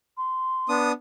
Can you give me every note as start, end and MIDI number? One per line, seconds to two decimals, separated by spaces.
0.17 0.79 84
0.69 0.92 59
0.69 0.92 62
0.69 0.92 87